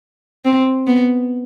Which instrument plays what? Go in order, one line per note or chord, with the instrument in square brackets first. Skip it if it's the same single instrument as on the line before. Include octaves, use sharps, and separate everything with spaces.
[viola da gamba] C4
B3